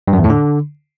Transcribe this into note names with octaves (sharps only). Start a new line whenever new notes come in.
G2
F#2
E2
A2
D3